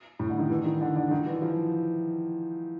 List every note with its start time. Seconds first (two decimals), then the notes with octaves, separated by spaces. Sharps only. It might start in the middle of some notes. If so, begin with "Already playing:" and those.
0.19 A2
0.30 D3
0.39 D#3
0.50 E3
0.66 D#3
0.81 D3
0.96 D3
1.11 D#3
1.26 E3
1.42 F3